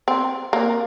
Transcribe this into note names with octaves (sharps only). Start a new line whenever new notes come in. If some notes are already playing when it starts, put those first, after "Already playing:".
C4
A#3